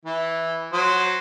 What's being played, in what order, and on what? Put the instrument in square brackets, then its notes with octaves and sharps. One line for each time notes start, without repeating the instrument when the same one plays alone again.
[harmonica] E3
F#3 C5